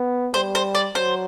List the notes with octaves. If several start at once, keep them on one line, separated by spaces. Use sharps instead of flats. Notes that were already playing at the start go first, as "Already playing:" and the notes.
Already playing: B3
G3 C5
C5
D5
F#3 C5